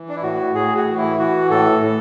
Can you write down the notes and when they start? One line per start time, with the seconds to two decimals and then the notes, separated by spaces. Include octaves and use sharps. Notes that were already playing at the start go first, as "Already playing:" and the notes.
Already playing: E3
0.09 D4
0.16 E4
0.22 A2 F#4
0.55 A2 G#4
0.76 F#4
0.86 E3
0.97 E4
1.18 E3 F#4
1.50 A2 A4
1.82 A2 A4